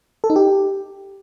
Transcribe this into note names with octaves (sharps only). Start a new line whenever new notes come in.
A4
D#4
G4